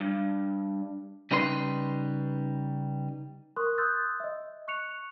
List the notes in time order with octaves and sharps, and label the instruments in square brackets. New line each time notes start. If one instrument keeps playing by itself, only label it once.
[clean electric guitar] G2
C#3 G3 D#4 B4 D5 C6
[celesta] A#4 C6 C#6 D#6 F#6
C6 D#6 E6 F#6 G6 A6
D#5 E5
C#6 F#6 C#7 F7